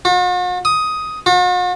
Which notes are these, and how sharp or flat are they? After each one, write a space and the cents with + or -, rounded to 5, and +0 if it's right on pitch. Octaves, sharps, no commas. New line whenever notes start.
F#4 -45
D#6 +10
F#4 -45